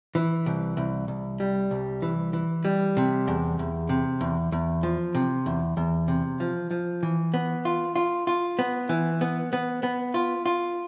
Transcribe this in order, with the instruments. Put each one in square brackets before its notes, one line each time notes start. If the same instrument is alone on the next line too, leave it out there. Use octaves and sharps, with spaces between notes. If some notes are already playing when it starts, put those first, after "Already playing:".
[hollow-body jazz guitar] E3
C2
C2
C2
G3
C2
E3
E3
G3
C3
E2
E2
C3
E2
E2
F3
C3
E2
E2
C3
F3
F3
E3
B3
F4
F4
F4
B3
E3
B3
B3
B3
F4
F4